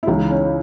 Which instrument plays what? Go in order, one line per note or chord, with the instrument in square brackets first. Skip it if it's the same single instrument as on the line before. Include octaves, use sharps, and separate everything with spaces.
[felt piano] E4
C#2 C#3 E3 D#4
C#4